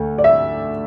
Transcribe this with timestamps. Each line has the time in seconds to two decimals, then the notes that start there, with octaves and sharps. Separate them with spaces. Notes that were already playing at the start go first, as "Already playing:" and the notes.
Already playing: D2 A3
0.18 D5
0.24 E5